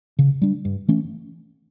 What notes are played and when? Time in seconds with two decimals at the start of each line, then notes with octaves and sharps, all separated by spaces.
0.19 C#3
0.42 G3 D4
0.65 G2
0.88 E3 A3 C#4